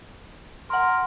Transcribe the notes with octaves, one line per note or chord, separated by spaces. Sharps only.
A#4 F#5 C6